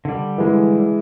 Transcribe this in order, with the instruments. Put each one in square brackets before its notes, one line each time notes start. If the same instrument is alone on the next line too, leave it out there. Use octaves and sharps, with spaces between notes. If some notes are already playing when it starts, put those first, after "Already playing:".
[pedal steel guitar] D3 G3
[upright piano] E3 G#3